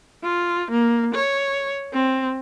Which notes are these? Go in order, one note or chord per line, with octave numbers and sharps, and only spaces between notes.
F4
A#3
C#5
C4